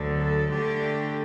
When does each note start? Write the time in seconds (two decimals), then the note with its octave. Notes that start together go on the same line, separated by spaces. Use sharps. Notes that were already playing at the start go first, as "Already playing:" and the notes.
Already playing: D2 D3 F#3
0.18 A4
0.51 D3 A3 D4 G4